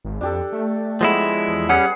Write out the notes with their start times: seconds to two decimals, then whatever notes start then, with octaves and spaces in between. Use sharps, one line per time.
0.04 G#1
0.21 F2 D4 G4 A4
0.52 A3
1.01 F3 G#3 B3 E4
1.48 E2
1.69 G3 C#4 G#4 B4 F#5